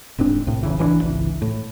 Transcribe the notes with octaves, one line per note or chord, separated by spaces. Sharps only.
E1 G#2 C4 D4
C2 A2
E1 C#3 E3
A1 E3 C4 D4
G#1 C#2 E3
A2